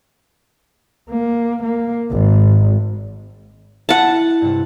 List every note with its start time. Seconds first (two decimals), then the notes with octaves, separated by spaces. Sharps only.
1.10 A#3
1.63 A#3
2.11 G#1
3.89 E4 F#5 A5
4.42 G2 C3